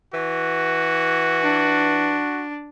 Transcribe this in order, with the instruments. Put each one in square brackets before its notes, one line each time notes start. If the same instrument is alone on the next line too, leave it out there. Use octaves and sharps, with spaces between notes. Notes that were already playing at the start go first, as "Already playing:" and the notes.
[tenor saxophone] E3 [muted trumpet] F#4
[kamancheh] D4